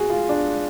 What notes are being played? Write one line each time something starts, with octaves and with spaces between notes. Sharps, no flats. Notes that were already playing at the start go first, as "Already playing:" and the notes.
Already playing: F#4 G#4
F4
D4